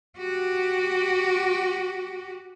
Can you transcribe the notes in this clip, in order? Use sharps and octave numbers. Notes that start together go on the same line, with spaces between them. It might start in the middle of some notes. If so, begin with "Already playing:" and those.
F#4 G4